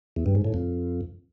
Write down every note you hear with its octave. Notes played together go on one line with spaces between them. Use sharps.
E2
G2
G#2
A2
F2